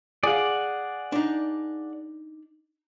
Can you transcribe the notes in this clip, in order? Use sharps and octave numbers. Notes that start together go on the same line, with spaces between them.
G#4 D5 F5 F#5
D4 D#4